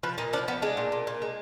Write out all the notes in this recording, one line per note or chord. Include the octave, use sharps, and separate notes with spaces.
F3 B4
A#2 D#4
F3 D4
F3 B3
G#3 D4
A#2
A#2
A#2
G#3